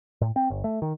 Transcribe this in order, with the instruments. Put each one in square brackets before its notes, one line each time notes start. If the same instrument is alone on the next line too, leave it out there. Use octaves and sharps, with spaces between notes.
[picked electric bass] A2
C4
G1
A3
D#3